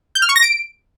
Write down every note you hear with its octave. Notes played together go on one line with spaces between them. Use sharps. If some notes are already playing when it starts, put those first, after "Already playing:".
G6
F6
C#6
A#6
D7